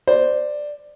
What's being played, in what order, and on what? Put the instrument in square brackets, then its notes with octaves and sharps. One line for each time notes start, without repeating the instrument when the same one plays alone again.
[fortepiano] C5 [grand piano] D5